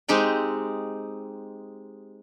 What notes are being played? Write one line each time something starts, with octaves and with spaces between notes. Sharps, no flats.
G#3 C4 D#4 G4 G5